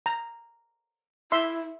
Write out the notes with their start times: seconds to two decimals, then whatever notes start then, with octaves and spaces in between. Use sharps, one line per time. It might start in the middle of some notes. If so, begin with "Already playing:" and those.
0.06 A#5
1.32 E4 E5 C6